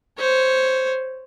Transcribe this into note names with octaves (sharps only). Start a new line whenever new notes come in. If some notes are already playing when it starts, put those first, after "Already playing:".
C5 C#5